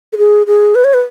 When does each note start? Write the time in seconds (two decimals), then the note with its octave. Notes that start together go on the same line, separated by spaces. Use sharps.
0.13 A4
0.18 G#4
0.47 G#4
0.75 B4
0.84 C#5
0.94 B4